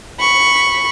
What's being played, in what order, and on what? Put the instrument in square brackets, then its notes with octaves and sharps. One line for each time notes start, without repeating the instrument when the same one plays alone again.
[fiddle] B5 C#6